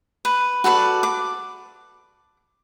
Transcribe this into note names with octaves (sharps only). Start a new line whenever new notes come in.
B4
F#4 A4 B4 D5
D6